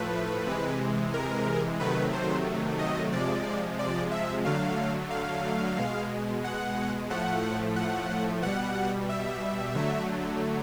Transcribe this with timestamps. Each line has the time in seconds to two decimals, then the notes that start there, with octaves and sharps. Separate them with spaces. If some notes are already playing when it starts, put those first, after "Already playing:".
Already playing: A2 F3 A3 B4
0.47 C3 E3 G#3
1.14 A#4
1.80 C3 D#3 F#3 A3 B4
2.13 C5
2.79 D#5
3.12 C3 F3 G#3 D5
3.79 D5
4.11 E5
4.45 D3 F#3 A3 F5
5.10 F5
5.77 B2 G#3
6.44 F#5
7.10 A2 F3 A3 F#5
7.76 F#5
8.42 B2 G3 F#5
9.09 E5
9.75 D3 F#3 A3